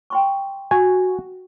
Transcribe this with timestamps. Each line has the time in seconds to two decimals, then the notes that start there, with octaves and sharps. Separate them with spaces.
0.10 G5 C6 C#6
0.71 F#4 G#5